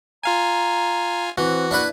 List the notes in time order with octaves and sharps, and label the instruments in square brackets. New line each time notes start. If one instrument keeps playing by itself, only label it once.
[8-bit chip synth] F4 F5 G#5 [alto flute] A#5
[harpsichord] E3 [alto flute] C4 [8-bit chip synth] F#4
[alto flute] A#3 [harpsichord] D4 E4 B4